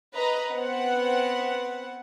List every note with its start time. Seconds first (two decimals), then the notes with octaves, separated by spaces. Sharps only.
0.15 B4 D#5 A#5
0.53 B3 C4 F#5